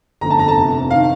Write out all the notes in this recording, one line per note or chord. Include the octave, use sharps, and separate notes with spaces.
G1 F2 D3 A3 A#5
A5
A#5
A5
F1 F2 C3
D#3 F5